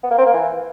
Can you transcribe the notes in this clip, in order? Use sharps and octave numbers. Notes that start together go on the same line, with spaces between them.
B3
A#3
C4
A#3
E3